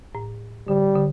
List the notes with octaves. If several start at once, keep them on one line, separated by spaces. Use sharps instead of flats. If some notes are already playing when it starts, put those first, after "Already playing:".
A2
D3 G3
D3